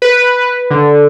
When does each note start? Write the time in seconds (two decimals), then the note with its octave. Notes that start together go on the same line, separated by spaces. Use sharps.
0.02 B4
0.71 D3